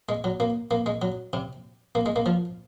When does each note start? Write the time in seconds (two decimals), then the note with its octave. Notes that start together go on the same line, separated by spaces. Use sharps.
0.09 G#3
0.24 F#3
0.40 A#3
0.71 A#3
0.86 G#3
1.02 F#3
1.33 C3
1.95 A#3
2.06 G#3
2.16 A#3
2.26 F3